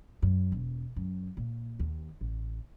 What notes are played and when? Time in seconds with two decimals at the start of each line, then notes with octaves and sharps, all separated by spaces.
0.22 F#2
0.52 E1
0.96 F#2
1.37 A#2
1.79 D#2
2.21 A1